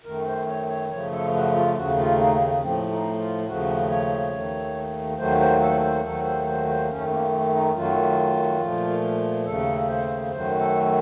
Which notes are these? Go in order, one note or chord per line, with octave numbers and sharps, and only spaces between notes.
F#2 D#3 A3 A#4
C5
C#5
C#5
F#2 C#3 F3 A3 C#5
A4
F#4
F4
D#2 C#3 A3 F#4
F4
D#4
A3
A2 F3 A3 C4
D#4
F4
D#2 C#3 F3 A3 F#4
C#5
D#2 D#3 A3
D#2 D#3 F#3 A3 C5
C5
A4
C5
D#2 D#3 F#3 A3 A4
C5
C5
C5
F#2 D#3 A3 C#4
A#3
D#4
F#2 D#3 F#3 A3 F4
A#2 F3 A3
D#2 C#3 A3 A4
C5
F#2 D#3 F#3 A3 C5
A4